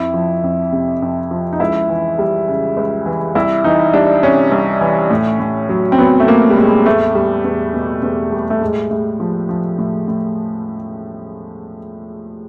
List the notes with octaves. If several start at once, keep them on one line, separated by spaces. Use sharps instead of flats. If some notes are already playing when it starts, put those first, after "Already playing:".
Already playing: F2 E4
F3
F2
C3
F2
F3
D#4
C#2 E4
E3
G3
C#3
C#2
E3
C2 E4
E3 D#4
G3 D4
C3 C#4
C2
E3
A2
A2
F#3
C4
F#3 B3
A3
A2 A#3
G3
A2 G#3
E2 A3
G3
E2
B2
E2
G3
A3
A2 G#3
A2
F3
F3
A2
A2